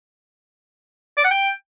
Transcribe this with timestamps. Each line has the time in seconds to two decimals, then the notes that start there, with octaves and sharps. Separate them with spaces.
1.18 D5
1.24 F#5
1.31 G5